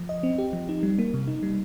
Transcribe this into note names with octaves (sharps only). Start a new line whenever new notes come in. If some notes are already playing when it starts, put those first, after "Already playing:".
Already playing: F3
D#5
C4
G4
F3
D#4
G3
A#3
C3
D#4
G3